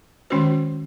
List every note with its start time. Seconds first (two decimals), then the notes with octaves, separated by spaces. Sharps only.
0.30 D#3 G#3 C#4 F#4 C5